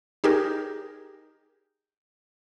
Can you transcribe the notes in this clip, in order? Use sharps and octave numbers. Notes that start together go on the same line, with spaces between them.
D#4 G4 G#4 A#4